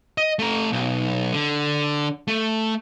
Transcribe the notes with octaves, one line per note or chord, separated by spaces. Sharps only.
D#5
A3 A#5
B1
D3
A3